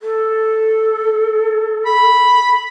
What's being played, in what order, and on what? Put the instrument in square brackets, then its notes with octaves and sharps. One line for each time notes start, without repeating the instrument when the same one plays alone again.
[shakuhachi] A4
[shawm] B5